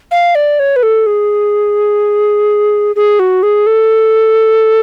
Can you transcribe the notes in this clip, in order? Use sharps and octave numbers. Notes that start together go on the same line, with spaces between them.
F5
D5
C#5
B4
A4
G#4
G#4
F#4
G#4
A4